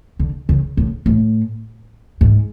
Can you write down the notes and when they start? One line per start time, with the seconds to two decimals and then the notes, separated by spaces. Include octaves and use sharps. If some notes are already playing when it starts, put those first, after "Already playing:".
0.19 D3
0.49 C#3
0.77 A2
1.06 A2
2.21 G#2